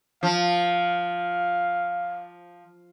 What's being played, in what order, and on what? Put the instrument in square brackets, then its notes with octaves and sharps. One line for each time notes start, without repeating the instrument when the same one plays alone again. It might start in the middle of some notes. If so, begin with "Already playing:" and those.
[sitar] F3 [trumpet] F5